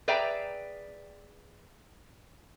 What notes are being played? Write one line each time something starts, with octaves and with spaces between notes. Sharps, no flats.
G#4 B4 D5 E5 G5 A#5